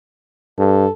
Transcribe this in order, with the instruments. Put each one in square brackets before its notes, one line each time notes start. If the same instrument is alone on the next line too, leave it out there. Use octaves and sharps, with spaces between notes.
[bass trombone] G2 [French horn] A4